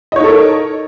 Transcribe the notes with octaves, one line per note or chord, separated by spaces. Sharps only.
D#4 A4 A#4 C#5 D#5